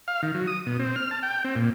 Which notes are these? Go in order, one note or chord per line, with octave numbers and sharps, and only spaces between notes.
F5
D#3
F#3
D#6
B2
C4
F6
A5
G5
C4
A#2